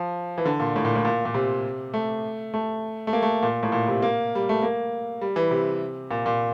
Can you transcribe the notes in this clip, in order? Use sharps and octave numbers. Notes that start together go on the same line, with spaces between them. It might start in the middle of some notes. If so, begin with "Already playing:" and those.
Already playing: F3
E3
D3
A#2
A2
A#2
A2
A#2
A#2
C3
A3
A3
A3
A#3
A3
A#2
A2
A#2
C3
A#3
G3
A3
A#3
G3
E3
C3
A#2
A#2